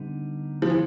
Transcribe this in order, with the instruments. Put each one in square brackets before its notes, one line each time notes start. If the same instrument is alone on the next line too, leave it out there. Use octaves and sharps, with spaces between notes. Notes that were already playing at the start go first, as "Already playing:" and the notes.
Already playing: [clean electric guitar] D3 G3 B3 D#4
[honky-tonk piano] F3
E3